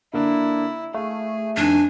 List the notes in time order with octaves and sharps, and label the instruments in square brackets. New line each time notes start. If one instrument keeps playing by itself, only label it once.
[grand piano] D3 A#3 D4 [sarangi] E4
[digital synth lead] A3 [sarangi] G#4 [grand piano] F5
[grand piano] F2 D#3 [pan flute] D4 [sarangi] G#5